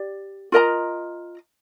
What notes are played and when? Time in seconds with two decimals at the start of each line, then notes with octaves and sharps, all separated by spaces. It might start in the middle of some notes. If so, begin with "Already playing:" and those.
Already playing: G4 D5
0.52 F4 A#4 D#5 A#5